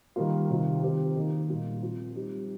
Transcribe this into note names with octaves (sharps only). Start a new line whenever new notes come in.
D#3 G3 A#3 F4
C3 D#3 C4 F4
D#3 C4 G4
D#3 A#3 D#4
A#2 G3 A#3 F4
F3 C4 F4
G3 C4 D#4 G4